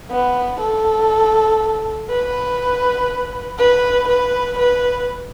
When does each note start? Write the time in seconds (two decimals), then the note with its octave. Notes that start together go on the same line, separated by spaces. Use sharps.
0.11 B3
0.60 A4
2.10 B4
3.59 B4
4.08 B4
4.59 B4